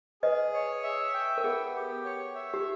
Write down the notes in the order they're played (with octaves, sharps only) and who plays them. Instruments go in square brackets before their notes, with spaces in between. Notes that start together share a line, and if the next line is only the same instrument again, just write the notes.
[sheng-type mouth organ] G#4 [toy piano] B4 D#5
[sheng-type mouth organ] C#5
E5
G5
[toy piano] A#4
[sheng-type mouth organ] B3 [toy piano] G#4
[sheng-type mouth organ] G4
C#5
E5
[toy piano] G4